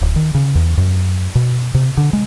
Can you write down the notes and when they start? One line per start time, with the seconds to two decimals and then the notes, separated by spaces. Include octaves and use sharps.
0.02 D1
0.16 D#3
0.35 C#3
0.55 E2
0.78 F#2
1.35 B2
1.75 C3
1.97 D3
2.13 G#3